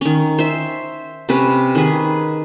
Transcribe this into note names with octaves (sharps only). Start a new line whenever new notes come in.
D#3 C#4
C5 E5
C3 C#4 B4
D#3 G#4 B4